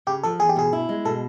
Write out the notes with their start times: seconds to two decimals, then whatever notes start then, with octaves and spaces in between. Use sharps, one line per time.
0.07 C#3 G4
0.23 F3 A4
0.39 E2 G#4
0.49 G4
0.56 B2 G#4
0.73 E4
0.89 G#3
1.05 B2 A4